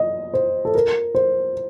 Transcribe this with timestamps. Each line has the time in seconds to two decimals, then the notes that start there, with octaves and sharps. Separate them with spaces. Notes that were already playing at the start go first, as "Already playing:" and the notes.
Already playing: D#5
0.34 C5
0.65 A4
0.75 A#4
1.15 C5